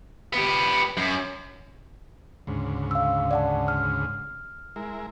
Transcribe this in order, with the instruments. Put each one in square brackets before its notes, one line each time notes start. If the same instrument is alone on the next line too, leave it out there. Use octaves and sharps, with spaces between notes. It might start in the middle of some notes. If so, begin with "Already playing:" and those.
[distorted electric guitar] B3 G4
F#2
[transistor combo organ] D2 G#2 C#3
[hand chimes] F5 E6
D5 F#5 A5
F6
[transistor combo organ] G#3 E4 A#4